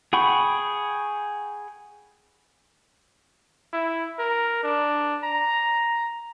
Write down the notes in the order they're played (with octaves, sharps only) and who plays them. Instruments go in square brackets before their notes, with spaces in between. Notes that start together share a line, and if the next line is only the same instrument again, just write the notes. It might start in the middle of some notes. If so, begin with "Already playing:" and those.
[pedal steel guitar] G#4 F#5 G5 B5 C#6
[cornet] E4
A#4
D4
A#5